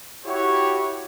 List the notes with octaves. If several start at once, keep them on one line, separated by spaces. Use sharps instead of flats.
E4 F#4 G4 C#5